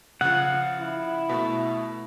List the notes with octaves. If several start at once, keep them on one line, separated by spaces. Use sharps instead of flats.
C#3 F3 F#5
E4
B2 A3